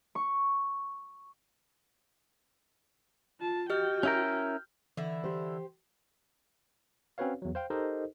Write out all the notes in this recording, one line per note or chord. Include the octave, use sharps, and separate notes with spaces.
C#6
F4 A5
F#4 G4 D#5 G5 F6
C#4 E4 A#4 F6 G6
D3 E3 E4
G4 C5
C4 C#4 F#4 B4 C#5 F5
E2 F#3
C5 F5 G5
D#4 G4 A4 A#4 C5 D#5